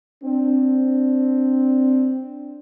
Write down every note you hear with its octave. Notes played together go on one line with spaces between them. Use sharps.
C4 D4